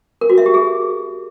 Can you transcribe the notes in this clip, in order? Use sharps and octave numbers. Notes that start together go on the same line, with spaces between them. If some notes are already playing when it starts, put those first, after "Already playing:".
A#4
F#4
E5
G4
G#4